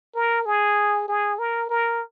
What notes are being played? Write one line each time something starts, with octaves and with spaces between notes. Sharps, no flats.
A#4
G#4
G#4
A#4
A#4